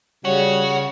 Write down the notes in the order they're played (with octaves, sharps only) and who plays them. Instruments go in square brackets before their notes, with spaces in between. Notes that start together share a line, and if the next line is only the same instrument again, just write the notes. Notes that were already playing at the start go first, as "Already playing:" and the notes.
[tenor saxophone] C#3 [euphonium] G3 [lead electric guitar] F#4 [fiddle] C#5